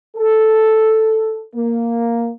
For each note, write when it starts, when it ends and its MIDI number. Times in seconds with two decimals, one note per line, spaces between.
0.16 1.44 69
1.55 2.31 58